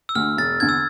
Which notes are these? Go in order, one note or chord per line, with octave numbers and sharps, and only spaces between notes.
E6
D2 D3 F6
E1 A6
E2 D3 G#6
E6